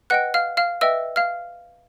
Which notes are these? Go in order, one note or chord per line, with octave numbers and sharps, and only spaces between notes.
B4 D#5 F#5 G5 F#6
F5 F6
F5 F6
B4 D#5 E5 G5 E6
F5 F6